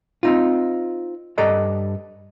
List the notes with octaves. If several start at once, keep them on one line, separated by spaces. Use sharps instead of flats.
C4 D#4 F4
G2 A4 D5 D#5 A#5